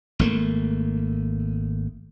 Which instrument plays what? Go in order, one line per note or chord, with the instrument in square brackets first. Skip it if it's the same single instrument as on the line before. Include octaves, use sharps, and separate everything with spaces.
[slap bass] G#1 A3 A#3